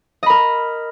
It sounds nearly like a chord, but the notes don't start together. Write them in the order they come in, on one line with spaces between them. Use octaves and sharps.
D#5 B5 A#4